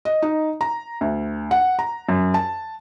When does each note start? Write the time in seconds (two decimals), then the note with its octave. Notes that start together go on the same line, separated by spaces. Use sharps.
0.05 D#5
0.22 D#4
0.61 A#5
1.01 D2
1.51 F#5
1.79 A#5
2.09 F#2
2.34 A5